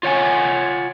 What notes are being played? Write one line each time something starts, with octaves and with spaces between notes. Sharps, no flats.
F4 C#5 F#5 G#5